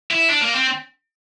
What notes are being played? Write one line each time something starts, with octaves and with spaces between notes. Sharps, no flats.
E4
D4
A#3
C4